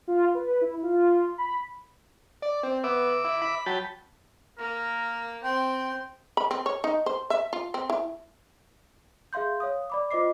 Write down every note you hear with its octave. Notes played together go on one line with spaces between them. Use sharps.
F4
B4
E4
F4
B5
D5
C4
B3 E5 D6
E4
B5
F#3 G5 A5 B5
A#3 A#4
C4 G5 C6
B5
C4
C#5
D#4
C5
E5
F4
C4
E4
G#4 E5 F5 C6 G6
C#5 F5 D#6
D5 B5 D6
F4 C5 D#5 D6 C7